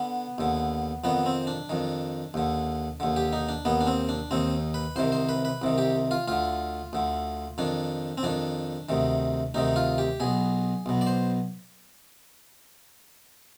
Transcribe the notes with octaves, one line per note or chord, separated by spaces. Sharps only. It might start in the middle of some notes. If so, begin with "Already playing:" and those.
Already playing: D3 B3
D#2 D3
F2 D#3 B3
C4
D4
F2 D#3
D#2 D3
D#2 D3
G4
D#4
D4
D#2 D#3 B3
D4
C4
D4
D#2 D#3 C4
B4
C2 C3 D#3 C5
C5
B4
B4
C2 C3 D#3
G4
F4
D2 D3 F4
D2 D3
F2 D#3 D4
C4
F2 D#3 D4
D2 C3 D#3
D2 C3 D#3 D#4
F4
G4
B1 B2 G#4
B1 B2
D5
C5